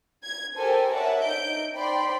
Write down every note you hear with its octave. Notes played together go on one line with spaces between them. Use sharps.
G#6
G4 A4 A#4 C5 G5 G#5
A#4 C#5 D5 E5 F#5 A5
D#4 G6 D7
C5 D5 G5 B5 C6